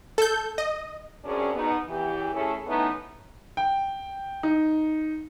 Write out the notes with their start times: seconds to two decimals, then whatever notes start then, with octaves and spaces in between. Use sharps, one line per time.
0.18 A4 G6
0.58 D#5
1.25 F#2 C3 C#4 D4 G#4
1.54 B2 B3 D#4
1.88 E2 E3 G4
2.33 A3 C#4 E4 G#4 A4
2.67 E3 A3 B3 C#4 D#4
3.57 G5
4.43 D#4